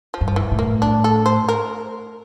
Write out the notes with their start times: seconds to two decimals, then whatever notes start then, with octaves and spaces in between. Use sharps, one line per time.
0.14 F3
0.21 G2
0.28 F3
0.36 E3
0.51 A2
0.59 A#3
0.82 D4
1.04 A4
1.26 C5
1.48 A#4